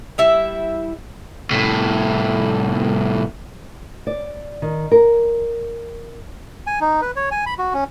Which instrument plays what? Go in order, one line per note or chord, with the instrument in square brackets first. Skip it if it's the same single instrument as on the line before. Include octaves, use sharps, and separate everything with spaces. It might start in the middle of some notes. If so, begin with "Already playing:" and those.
[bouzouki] G3 E4 E5
[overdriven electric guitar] C2 A2
[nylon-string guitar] D5
D#3
A#4
[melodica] G#5
D#4
B4
C#5
G#5
B5
F#4
C#4